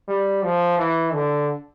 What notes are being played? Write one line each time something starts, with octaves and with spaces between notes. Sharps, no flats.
G3
F3
E3
D3